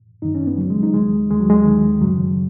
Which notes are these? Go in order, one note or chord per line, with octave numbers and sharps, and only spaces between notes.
F#2 D#3 D#4
C#4
B3
C#2 C#3 F#3
G#3
D#4
D#2 D#3 G#3
D#2 D#3 G#3
F#3
G#3
D#2 D#3
F#2 C#3 F#3